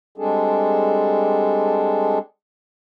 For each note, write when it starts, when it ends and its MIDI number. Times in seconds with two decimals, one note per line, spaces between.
0.18 2.19 55
0.18 2.19 56
0.18 2.19 60
0.18 2.19 62
0.18 2.19 68
0.18 2.19 69